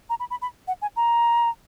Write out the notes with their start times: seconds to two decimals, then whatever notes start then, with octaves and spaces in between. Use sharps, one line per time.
0.09 A#5
0.20 B5
0.30 B5
0.42 B5
0.67 F#5
0.82 G#5
0.96 A#5